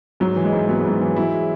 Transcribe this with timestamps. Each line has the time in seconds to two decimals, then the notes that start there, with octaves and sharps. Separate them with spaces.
0.20 G#2 F#3
0.36 E3
0.45 G#3
0.53 G#2
0.69 F#3 B3
0.79 G#3
0.85 G#2 F#3
1.01 E3
1.16 F#3 E4
1.33 G#3